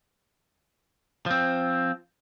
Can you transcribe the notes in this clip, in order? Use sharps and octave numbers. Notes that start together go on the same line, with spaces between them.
F3 C4